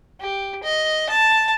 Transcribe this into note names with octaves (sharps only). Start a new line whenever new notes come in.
G4
D#5
A5